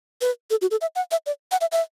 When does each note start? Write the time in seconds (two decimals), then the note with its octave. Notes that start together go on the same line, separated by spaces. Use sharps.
0.21 B4
0.51 A4
0.62 F#4
0.71 A4
0.81 E5
0.96 F#5
1.11 E5
1.26 D5
1.52 F#5
1.61 E5
1.72 E5